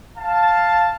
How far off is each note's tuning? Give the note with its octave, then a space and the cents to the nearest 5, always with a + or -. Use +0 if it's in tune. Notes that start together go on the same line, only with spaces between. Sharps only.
F5 +0 A5 +0